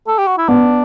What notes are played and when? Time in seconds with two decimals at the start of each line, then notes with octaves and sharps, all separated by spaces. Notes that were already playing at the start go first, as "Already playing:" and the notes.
0.07 A4
0.18 G4
0.28 F#4
0.38 E4
0.48 B3 D4